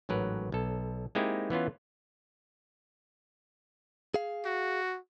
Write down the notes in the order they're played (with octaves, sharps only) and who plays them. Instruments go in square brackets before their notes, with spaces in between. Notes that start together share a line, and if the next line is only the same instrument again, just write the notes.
[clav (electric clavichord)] A1 G#2 F#3 A#4 B4
B1 A4
G#3 A#3 C4 D#4 E4 G4
E3 B3 C#4 F4
[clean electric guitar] G#4 F5
[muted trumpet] F#4